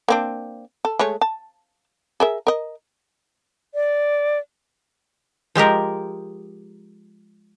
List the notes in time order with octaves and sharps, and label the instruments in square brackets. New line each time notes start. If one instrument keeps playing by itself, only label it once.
[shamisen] A#3 C4 D4
A4
G#3 A3 C#5
A5
G#4 A#4 E5
A#4 D#5
[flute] D5
[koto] F3 G#3 G4 A#4